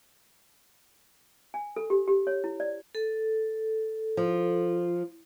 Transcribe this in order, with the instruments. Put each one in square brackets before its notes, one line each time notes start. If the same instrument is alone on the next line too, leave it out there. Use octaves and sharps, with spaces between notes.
[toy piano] G#5
A4
G4
G4
C#5
E4
D5
[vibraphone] A4
[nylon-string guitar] F3